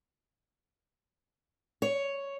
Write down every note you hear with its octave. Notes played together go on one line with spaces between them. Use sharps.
C#5